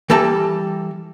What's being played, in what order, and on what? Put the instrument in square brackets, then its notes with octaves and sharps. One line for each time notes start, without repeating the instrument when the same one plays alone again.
[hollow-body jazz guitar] E3 G3 A4 A5 A#5